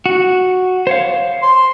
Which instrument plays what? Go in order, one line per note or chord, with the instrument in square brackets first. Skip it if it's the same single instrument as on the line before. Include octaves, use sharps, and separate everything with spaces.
[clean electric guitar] F#4
C5 C#5 F5
[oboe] C6